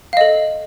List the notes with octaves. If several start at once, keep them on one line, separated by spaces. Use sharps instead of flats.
A4 D#5 F5